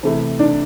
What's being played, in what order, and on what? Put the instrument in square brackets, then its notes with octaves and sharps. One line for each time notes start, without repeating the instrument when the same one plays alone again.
[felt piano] C3 E3 A3 E4
[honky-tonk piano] D4